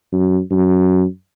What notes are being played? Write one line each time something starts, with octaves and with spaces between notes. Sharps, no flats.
F#2
F#2